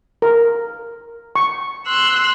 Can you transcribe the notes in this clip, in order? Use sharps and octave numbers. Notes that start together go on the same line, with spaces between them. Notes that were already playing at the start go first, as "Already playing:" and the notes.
A#4
C#6
C6 E6 F#6